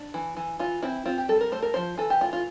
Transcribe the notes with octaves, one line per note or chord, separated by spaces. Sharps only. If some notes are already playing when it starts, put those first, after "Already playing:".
Already playing: D4
E3
E3
E3 F4
C4 E4
C4 F4
G4
G3 A4
A#4
A3 C5
A#4
F3 C5
E3 A4
G4
A3 F4
F4